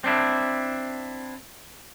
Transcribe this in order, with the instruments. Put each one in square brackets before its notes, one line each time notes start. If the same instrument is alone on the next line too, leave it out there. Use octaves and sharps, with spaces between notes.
[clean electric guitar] C4 D4 E4